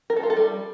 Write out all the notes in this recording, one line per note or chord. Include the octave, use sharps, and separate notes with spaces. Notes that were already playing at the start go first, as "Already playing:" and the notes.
A#4
A4
F4
A4
G3